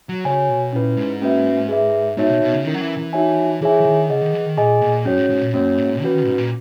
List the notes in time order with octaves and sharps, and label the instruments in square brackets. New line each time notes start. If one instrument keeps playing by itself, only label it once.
[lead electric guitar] F#3
[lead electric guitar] C#3 [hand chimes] F#4 C#5 G#5
[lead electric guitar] B2
[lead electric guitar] A#2 [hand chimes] C#4 E4 B4
[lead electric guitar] G#2
[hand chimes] A#3 C#4 F#4 B4 E5
G#4 B4 E5
[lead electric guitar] G#2 [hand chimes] B3 D#4 F#4 C#5 E5
[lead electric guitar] B2
B2
C#3
[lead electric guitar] D#3 [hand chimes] C#4 E4 A#4
[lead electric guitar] F#3
E3
E3
[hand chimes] D#4 F#4 C#5 E5 G#5
[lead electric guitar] E3 [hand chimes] E4 G#4 C#5 E5 G#5
[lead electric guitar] E3
D#3
[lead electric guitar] C#3 [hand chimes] G#4 D#5 F#5
[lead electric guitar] D#3
E3
D#3
[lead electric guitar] A#2 [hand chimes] G#4 D#5 G#5
[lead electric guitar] A#2
[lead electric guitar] F#2 [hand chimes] C#4 F#4 C#5
[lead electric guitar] G#2
G#2
A#2
[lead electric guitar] F#2 [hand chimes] A#3 C#4 F#4 C#5
[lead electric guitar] G#2
[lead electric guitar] E3 [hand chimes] C#4 F#4 B4
[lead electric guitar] D#3
G#2
A#2